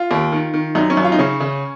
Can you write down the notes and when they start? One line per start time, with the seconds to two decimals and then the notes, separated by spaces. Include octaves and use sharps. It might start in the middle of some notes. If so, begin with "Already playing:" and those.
Already playing: F4
0.11 D#2
0.32 D#3
0.54 D#3
0.75 F#2 D#4
0.90 C#4
0.97 F#2
1.04 F4
1.12 D#4
1.19 C#3 C#4
1.40 C#3